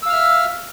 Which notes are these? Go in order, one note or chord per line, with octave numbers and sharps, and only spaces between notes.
E5 F5 E6 F6